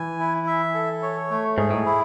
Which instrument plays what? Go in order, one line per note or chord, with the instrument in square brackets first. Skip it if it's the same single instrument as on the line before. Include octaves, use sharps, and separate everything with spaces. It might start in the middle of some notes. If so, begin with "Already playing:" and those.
Already playing: [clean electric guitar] E3 [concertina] G#5
[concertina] E4
E5
A4
C#5
A3
[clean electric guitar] G#2 [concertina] G#4
[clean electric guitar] A2
[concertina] E4